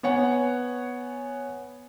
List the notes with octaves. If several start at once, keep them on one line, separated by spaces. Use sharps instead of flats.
B3 C#5 F#5 G#5